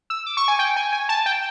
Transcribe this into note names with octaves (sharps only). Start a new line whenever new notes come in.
E6
D6
C#6
G#5
G5
G#5
G#5
A5
G5